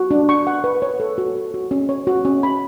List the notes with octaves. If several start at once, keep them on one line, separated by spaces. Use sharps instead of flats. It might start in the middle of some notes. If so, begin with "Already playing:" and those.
Already playing: F#4
D4
C#6
F#5
B4
C#5
A4
F#4
C#5
F#4
C#4
C#5
F#4
C#4
B5